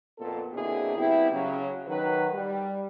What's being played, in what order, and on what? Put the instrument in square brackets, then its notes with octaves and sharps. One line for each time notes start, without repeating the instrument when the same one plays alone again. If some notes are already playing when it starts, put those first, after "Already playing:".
[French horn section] F2 A#2 B3 A4
B2 D3 A#3 C4 E4 G#4
G3 B3 C4 E4
C#3 F#3
D#3 F#3 B4
G3